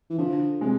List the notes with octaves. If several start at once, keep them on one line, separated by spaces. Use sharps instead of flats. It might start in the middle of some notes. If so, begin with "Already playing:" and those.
E3
D3 F3
C3 G#3